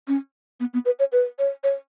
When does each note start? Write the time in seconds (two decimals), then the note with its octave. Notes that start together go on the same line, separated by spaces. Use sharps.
0.08 C#4
0.60 B3
0.74 B3
0.85 B4
0.99 C#5
1.12 B4
1.39 C#5
1.64 C#5